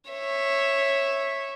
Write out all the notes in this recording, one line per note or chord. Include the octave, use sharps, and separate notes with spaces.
C#5 E5